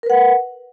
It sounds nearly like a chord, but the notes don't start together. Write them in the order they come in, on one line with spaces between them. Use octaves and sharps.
A#4 B4 F#5